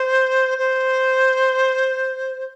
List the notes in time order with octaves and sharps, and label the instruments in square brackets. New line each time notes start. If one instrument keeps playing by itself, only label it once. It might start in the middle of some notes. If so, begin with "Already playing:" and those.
Already playing: [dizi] C5
C5